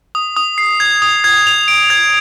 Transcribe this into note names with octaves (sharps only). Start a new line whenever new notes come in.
D#6
D#6
C7
G#6
D#6
G#6
F7
D7
G#6